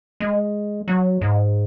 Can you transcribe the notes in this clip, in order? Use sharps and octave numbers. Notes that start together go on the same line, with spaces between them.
G#3
F#3
G#2